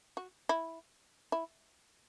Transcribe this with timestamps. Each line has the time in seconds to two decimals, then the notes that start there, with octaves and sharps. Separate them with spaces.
0.17 F#4
0.49 E4
1.32 E4